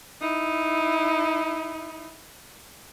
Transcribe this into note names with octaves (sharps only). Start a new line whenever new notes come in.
D#4 E4